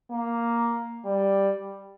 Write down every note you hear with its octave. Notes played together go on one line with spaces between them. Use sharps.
A#3
G3